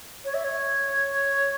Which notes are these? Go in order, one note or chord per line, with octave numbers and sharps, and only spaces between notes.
C#5
E5
C#5